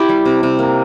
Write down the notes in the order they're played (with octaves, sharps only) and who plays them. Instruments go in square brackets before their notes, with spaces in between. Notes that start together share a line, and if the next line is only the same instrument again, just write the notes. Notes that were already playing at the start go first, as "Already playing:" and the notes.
Already playing: [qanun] E4 G4
G3
C3
C3
A#3